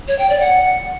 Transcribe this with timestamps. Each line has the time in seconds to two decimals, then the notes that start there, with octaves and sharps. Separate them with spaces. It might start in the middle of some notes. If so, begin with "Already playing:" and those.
0.08 C#5
0.19 G5
0.29 D5
0.40 F#5